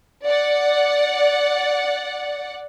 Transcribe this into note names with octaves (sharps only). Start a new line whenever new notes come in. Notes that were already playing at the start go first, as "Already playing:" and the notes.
D5 F#5